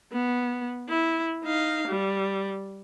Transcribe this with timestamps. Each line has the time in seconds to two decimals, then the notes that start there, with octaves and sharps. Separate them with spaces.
0.12 B3
0.89 E4
1.45 D#4 F5
1.88 G3